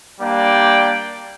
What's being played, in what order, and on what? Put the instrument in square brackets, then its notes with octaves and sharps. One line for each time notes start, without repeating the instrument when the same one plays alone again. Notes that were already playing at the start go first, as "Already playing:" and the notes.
[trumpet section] G3 A#3 D4 D5 G5